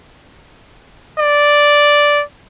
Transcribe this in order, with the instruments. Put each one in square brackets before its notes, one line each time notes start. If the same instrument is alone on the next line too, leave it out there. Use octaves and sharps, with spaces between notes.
[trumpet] D5